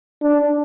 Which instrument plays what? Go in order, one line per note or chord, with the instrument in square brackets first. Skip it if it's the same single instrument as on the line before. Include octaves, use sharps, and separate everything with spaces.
[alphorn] D4